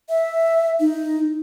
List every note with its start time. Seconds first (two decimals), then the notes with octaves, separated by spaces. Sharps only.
0.09 E5
0.80 D#4